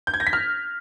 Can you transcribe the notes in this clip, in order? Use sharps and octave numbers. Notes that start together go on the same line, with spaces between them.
G6
G#6
A#6
B6
F6